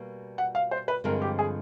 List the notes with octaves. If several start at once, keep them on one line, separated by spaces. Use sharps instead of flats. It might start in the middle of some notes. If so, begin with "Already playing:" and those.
Already playing: B2 G3 A#3
F#5
F5
C5
B4
G2 D3 F3 G#3 C4 A#4
G4
G#4